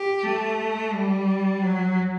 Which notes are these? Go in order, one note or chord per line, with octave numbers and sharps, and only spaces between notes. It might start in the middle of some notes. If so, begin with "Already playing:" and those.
Already playing: G4
A3
G3
F#3